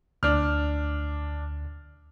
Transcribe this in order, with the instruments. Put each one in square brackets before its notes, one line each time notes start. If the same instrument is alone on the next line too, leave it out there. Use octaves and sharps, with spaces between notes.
[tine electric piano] D2 [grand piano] D4 F6